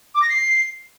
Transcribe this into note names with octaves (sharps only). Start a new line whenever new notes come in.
D6
A#6
C7